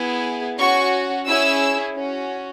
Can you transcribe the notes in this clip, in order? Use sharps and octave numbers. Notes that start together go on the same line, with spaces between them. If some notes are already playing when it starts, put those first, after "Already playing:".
Already playing: B3 E4 G#4
C#4 F#4 C#6
C#4 E4 G#4 E6
C#4 F#4